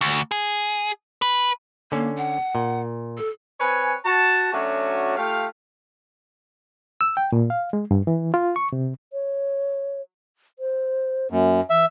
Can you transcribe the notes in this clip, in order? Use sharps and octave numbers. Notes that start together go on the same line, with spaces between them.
D2
G#4
B4
D3 A#3 C#4
F#5
A#2
A4
C4 B4 C#5 G#5
F#4 A5
F#3 A3 C#4 D4 F#4
A3 F4 G4 F5
E6
G5
A#2
F5
G#3
G2
E3
F4
C#6
C3
C#5
C5
F#2 A#3
E3 E5